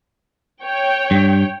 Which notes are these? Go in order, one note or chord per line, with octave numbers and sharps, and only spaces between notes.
C#5 G5
G2